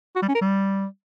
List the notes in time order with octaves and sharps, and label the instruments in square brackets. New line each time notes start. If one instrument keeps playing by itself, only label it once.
[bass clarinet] F#4
G3
C#4
A#4
G3